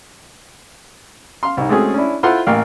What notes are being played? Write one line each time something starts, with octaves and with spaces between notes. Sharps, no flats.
F5 C6
C2 D#4
G#3 A3 C4 C#4 F#4 G#4
C#4 D4 E4
E4 F4 A4 C5 F#5 C6
A1 A#3 F5 G5